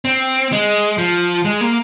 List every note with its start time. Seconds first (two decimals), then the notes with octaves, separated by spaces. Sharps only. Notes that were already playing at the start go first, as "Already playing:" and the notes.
0.05 C4
0.52 G#3
0.98 F3
1.45 G#3
1.61 A#3